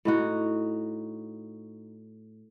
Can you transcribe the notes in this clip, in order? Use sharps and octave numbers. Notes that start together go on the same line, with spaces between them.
A2 D#4 F#4